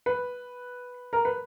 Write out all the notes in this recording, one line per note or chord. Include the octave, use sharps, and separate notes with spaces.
B4
A#4
B4